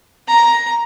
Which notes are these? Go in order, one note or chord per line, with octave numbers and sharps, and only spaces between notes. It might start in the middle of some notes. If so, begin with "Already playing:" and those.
A#5